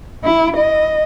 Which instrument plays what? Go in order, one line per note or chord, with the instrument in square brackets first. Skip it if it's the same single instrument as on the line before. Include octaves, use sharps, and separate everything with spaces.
[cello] E4
D#5